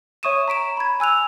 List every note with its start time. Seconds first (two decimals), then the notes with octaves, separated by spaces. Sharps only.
0.23 C#5 E5 C#6 D#6 D#7 E7
0.48 A#5 B6 D7 E7
0.77 B5 G#6
1.00 G#5 E6 F#6 F7